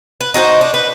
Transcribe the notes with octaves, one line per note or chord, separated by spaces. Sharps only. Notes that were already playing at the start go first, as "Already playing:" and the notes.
B4
D#4 F#4 G#4 C5
D4
B4